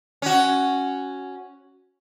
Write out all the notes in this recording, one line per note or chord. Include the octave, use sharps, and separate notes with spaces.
C#4 F#4